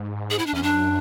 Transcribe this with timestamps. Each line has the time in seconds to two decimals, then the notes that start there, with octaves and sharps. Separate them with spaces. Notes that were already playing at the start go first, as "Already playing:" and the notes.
Already playing: G#2
0.30 G#4
0.39 E4
0.46 D4
0.53 E2 C#4
0.62 F#2 D4